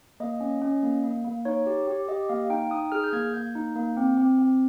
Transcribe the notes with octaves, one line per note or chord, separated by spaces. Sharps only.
A#3 D#5
C#4
C#4
A#3
A#3
A#3
D#4 C#5
G4
G4
G4 D#5
A#3 F5
D#4 G5
D#4 D#6
G#4 F6
G6
A#3 G#6
A#3 G6
D#4
A#3
C4
C4
C4